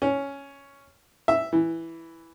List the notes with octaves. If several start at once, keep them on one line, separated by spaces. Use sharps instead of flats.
C#4
E5
E3